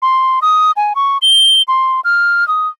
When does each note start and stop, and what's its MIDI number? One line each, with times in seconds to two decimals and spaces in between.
0.02 0.40 84
0.42 0.72 87
0.77 0.93 80
0.96 1.18 85
1.22 1.62 103
1.68 2.00 84
2.05 2.47 89
2.48 2.68 87